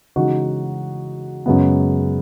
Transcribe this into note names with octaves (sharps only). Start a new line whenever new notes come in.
C#3 E3 G#3 D#4 F#4
F#2 C#3 G#3 B3